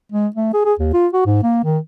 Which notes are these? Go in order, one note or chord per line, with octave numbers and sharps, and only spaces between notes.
G#3
A3
G#4
G#4
D#2
F4
F#4
G#2
A#3
D#3